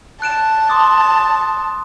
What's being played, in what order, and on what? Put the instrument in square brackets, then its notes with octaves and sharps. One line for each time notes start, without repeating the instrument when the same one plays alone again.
[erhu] A5 [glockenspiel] F#6 D7 E7
[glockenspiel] C6 D6 D#6